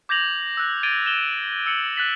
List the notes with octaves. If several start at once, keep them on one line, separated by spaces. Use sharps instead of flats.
D6 G6 G#6 A#6 F7 F#7
E6 F#6
G#6 A6 D7 D#7 G7
E7 G7
E6 C#7 F#7
F#6 A6 B6 F#7